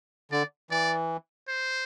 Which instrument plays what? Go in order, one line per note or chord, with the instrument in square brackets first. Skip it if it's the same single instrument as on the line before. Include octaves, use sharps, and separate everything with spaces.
[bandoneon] D3 [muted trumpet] D5
[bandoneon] E3 [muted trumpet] D5
[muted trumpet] C5